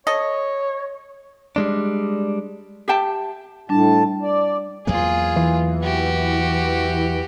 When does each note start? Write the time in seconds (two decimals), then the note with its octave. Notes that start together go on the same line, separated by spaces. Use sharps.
0.07 A4 C#5 D#5
1.56 G3 G#3 D4
2.88 G4 E5 G5 A5
3.69 A2 G3 D4 A5
4.22 D5
4.87 E2 F#3 A#3 F4 G#4
5.36 E3
5.82 F#4 G4